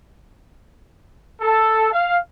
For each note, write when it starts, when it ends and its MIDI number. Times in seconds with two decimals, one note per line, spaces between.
1.41 1.88 69
1.91 2.18 77